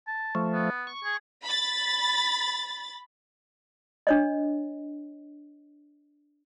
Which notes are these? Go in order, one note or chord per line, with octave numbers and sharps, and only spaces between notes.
A5
F3 A3
B3
C#6
G#4
B5 A6
D4 C#5 D#5